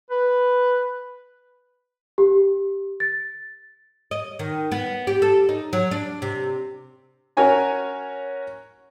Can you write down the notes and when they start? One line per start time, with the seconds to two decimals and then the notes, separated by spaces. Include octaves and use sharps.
0.10 B4
2.18 G4
3.00 A6
4.11 D#5
4.39 D#3
4.72 B3
5.07 G4
5.22 A4
5.49 D#4
5.73 F#3
5.91 D4
6.22 C3
7.37 C#4 F#4 A#4 C#5 G#5 A#5